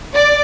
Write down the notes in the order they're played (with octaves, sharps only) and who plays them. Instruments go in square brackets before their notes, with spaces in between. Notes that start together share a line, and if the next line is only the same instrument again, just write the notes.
[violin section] D5